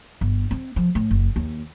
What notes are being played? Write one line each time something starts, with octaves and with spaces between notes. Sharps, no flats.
G1
C4
F3
A2
F#1
D#2